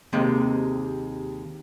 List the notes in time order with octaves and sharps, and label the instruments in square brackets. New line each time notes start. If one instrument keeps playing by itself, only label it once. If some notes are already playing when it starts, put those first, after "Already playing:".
[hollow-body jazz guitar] D#2 C3 G#3